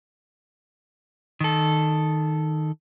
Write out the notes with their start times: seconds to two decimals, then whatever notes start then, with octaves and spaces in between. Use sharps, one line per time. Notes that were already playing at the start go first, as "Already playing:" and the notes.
1.40 D#3 A4